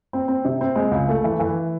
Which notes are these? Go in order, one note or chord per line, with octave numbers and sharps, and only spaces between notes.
C4
C4
C3
C4
G#3
C#2
A3
E3
E3